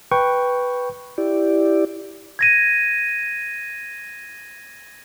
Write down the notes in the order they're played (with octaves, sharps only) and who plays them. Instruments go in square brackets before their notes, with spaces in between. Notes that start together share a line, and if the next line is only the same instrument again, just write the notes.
[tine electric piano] B4 G5 C#6
[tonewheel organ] E4 G4 D5
[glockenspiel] G#6 A#6 D#7